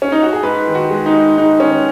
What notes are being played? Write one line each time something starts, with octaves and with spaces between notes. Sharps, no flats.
C#4
D#4
F#4
G#4
G#2 B4
D#3
F#4
G#3
D#4
G#2
G#2 D#4
D#3 C#4